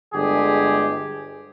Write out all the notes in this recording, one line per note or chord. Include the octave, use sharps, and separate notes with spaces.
G1 D3 G#3 G4 G#4